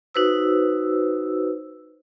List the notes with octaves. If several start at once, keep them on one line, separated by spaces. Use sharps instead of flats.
D#4 F#4 B4 C5 E6